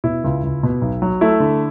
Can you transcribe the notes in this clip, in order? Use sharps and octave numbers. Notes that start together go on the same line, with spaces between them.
B2 E4
C#2
C#2
B2
B1
F#3
A3 E4
D3